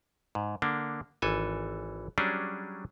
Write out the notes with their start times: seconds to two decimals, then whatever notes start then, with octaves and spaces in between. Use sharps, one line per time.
0.35 G#2
0.62 D3 A#3 D4
1.22 G#1 E3 A4 G#5
2.18 F#3 G3 C#4 D4 G#4